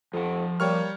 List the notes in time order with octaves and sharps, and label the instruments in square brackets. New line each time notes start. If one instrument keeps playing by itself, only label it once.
[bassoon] F2 [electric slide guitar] F3 F#5
[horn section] G3 [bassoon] A#3 [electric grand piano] C#5 C#6 F6